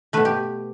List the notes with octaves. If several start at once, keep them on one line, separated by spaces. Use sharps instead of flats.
B2 A3 B4
G4